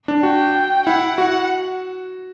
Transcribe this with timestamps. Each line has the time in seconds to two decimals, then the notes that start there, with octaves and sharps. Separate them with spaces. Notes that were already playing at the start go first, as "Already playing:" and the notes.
0.08 D4
0.23 F#4 G5
0.86 E4 F#5
1.18 F#4 F#5